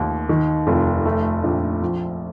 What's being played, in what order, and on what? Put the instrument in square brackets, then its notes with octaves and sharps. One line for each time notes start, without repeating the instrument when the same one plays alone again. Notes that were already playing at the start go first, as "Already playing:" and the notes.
Already playing: [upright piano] D#2 A3
D#3
F1
A3
A#1
F3